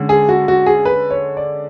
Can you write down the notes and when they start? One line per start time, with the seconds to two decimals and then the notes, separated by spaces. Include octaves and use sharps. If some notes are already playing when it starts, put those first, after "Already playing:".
Already playing: D3 G#3 C#4
0.09 G#4
0.29 F#4
0.48 F#4
0.66 G#4
0.85 B4
1.11 C#5
1.37 D5